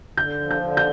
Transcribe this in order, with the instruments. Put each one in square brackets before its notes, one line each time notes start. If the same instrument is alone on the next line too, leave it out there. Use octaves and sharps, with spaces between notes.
[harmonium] D3 [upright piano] G6
[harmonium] F3
[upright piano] G6
[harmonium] D3
[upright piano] G6